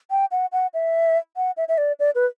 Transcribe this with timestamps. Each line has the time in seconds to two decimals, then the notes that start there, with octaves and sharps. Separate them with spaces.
0.11 G5
0.31 F#5
0.52 F#5
0.74 E5
1.37 F#5
1.57 E5
1.68 E5
1.78 D5
2.00 D5
2.15 B4